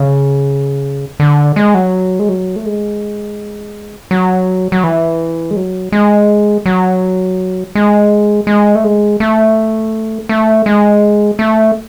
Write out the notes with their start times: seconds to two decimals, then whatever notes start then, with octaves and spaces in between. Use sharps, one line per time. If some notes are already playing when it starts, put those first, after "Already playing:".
Already playing: C#3
1.20 D3
1.56 G#3
1.74 F#3
2.19 G#3
2.29 F#3
2.56 A3
2.65 G#3
4.11 F#3
4.72 F#3
4.84 E3
5.51 G#3
5.56 F#3
5.92 G#3
6.66 F#3
7.75 G#3
8.47 G#3
8.75 A3
8.84 G#3
9.20 A3
10.29 A3
10.66 G#3
11.39 A3